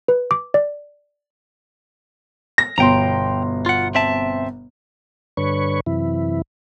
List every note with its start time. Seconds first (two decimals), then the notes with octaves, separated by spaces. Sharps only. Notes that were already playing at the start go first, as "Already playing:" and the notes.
0.08 B4
0.31 D6
0.54 D5
2.58 A#6
2.78 G1 B2 G5 A#5 C6
3.66 F4 F#5
3.95 C4 E5 A5
5.37 G2 D3 B4 C#5 C#6
5.86 F#2 C3 E3 E4